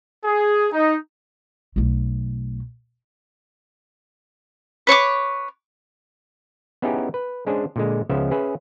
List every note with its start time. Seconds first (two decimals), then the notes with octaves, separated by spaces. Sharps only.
0.25 G#4
0.72 D#4
1.76 B1 A3
4.87 B4 C#5 C#6 D6
6.82 B3 C#4 D#4 E4 G4 G#4
7.14 B4
7.46 G#3 C#4 D4 G#4 C5
7.76 A#2 D3 G#3
8.09 C#2 C#3 F3 B3 C#4 E5
8.31 C#4 G#4 B4 E5